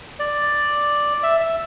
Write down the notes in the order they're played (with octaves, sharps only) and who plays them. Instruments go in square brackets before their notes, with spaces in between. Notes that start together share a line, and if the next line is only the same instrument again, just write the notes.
[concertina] D5
E5
E5